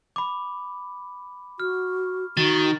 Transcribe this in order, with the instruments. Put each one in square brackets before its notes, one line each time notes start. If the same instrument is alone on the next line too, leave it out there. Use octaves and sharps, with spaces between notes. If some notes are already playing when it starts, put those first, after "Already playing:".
[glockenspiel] B5 D6
[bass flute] F#4 [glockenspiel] F6
[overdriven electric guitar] D#3 [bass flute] F#4 [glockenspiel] A6